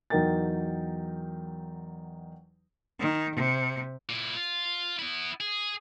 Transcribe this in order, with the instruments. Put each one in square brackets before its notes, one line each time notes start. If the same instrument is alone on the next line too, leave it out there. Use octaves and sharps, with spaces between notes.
[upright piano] E2 F#3 D#4 A#4 G5 A6
[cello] D#3
C3
[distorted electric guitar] A#2 E4
F4
B3 E4
G#4